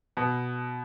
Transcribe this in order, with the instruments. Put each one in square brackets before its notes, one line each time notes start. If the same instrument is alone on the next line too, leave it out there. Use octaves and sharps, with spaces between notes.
[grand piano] B2